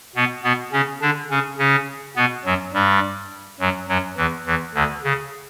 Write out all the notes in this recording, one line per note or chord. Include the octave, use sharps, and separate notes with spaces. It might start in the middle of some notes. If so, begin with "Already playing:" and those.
B2 B3
B2 B3
C#3 C#4
D3 D4
C#3 C#4
C#3 C#4
B2 B3
F#2 F#3
G2 G3
F#2 F#3
F#2 F#3
E2 E3
E2 E3
D2 D3
C#3